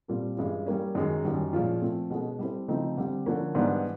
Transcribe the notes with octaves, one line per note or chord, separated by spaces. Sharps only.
A#2 G3 C4 F4 A4
G2 E3 G#3 C#4 F4
G3 A#3 C#4
F#2 D#3 G#3
F#2 D#3 G3
A#2 F3 G#3 C#4 F4
F3 A3 C4
B2 G#3 C#4 F#4 A4
G3 C4 E4 A4 C5
C#3 F3 A3 C4 D#4
D3 G3 C4
D3 F3 A#3 C#4
G#2 E3 G3 B3 D4